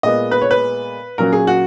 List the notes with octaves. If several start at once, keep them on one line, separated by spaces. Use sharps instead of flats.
A#2 G#3 B3 D#5
B4
C#5
B4
A#2 F#3 C#4 A#4
G#4
F#4